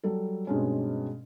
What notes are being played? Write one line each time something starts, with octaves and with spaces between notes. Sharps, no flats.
F#3 G3 A4
G2 B2 G#3 C4 C#4